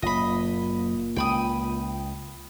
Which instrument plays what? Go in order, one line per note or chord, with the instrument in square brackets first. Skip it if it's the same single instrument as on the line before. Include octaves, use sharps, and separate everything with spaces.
[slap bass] F#1 [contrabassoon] A#2 [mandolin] D#5 B5
[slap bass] C#2 [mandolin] G5 B5 D#6